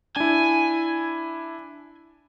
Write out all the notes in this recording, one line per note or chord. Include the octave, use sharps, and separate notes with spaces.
D4 E4 G#5